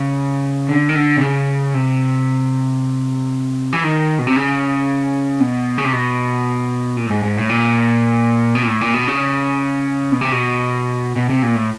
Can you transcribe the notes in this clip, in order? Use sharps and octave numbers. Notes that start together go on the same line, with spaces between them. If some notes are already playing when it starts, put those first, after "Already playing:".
Already playing: C#3
D3
D#3
D3
C3
C#3
C3
E3
D#3
B2
C3
C#3
B2
C#3
C3
B2
A#2
A2
G#2
G#2
A2
A#2
B2
A#2
A2
A#2
B2
C#3
B2
C3
B2
B2
C3
A#2
A2